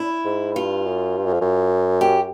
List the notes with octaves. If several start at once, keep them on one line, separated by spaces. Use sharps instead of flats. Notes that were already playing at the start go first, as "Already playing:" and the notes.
Already playing: E4
G#2
G2 F4
F#2
G2
F#2
F2
F#2
G4